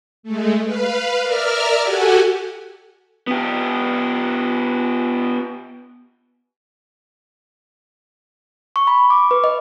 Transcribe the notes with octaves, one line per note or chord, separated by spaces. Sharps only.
G#3 A3
B4 F5
A#4 D5 E5 F6
F#4 G4 A4 F#5 G#5
B3 G4
C#6
B5
D6
B4
D#5